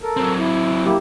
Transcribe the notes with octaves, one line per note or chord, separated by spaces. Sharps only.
A4 A#4
F#3 C4
E4
A#3 E4 G4